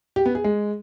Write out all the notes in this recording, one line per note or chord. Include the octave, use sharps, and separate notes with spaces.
G4
B3
G#4
G#3